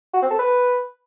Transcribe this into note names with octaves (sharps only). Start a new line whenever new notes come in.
F#4
C4
A4
B4